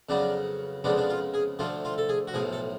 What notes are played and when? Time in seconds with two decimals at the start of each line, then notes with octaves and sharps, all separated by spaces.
0.09 F2 C#3 F#3 B3 D4
0.84 F2 C#3 F3 G#3 B3 D4
0.98 D4
1.10 F4
1.34 G#4
1.59 D2 D3 F3 A3 F4
1.85 F4
1.98 A4
2.09 G#4
2.27 F#4
2.34 B1 A2 F3 G#4
2.53 A4